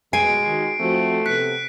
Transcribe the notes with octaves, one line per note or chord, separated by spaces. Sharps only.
B2 G#3 G#5 C7 D7
D#3 F#4
F3 A3 C4 F#4
C3 B3 A4 F#6 B6 C#7